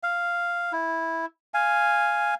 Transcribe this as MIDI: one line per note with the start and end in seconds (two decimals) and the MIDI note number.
0.03 0.72 77
0.73 1.26 64
1.54 2.34 77
1.54 2.34 80